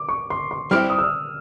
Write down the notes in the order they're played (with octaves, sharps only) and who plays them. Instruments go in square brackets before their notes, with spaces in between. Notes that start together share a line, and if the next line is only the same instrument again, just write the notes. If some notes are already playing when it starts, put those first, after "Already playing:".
Already playing: [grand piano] D6
C#6
C6
C6
[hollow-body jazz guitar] G3 C4 E4 G4 [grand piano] F6
[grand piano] D#6
E6